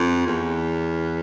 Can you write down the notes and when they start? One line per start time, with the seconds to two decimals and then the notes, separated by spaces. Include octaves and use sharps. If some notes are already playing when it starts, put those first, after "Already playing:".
Already playing: F2
0.27 E2